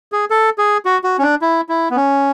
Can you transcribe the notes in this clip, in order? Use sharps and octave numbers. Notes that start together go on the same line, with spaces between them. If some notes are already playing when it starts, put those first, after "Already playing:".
G#4
A4
G#4
F#4
F#4
C#4
D4
E4
E4
B3
C#4